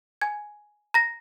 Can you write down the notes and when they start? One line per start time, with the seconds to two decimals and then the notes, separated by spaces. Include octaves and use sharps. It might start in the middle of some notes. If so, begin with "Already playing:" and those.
0.21 G#5 G#6
0.94 A#5 A#6